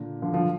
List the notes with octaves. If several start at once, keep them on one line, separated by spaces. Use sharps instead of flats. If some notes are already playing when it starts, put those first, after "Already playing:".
Already playing: A#2 D3
D3 F3
D3 F3